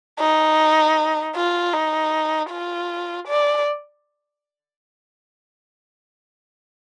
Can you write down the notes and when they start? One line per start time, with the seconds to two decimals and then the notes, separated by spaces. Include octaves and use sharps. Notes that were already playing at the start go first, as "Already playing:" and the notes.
0.20 D#4
1.36 F4
1.73 D#4
2.50 F4
3.28 D5